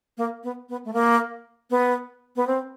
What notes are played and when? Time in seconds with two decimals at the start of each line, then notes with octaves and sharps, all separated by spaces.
0.18 A#3
0.44 B3
0.69 B3
0.85 A3
0.93 A#3
1.70 B3
2.36 B3
2.47 C4